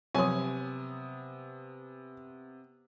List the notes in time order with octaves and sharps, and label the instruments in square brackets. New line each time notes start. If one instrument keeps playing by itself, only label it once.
[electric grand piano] C3 B3 [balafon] F3 F#3 [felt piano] G#5 D#6